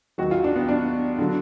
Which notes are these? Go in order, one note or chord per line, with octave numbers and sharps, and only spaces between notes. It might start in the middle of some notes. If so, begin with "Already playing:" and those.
D#2 D#3 F#3 F#4
F4
D4
B3
D4
D3 F#3